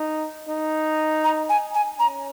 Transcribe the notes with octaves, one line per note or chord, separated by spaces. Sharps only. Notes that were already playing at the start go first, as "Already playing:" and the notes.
Already playing: D#4
D#4
A#5
G#5
G#5
C#4 A#5